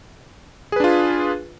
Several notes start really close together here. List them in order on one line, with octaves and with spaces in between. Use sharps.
G#4 B4 D4 F4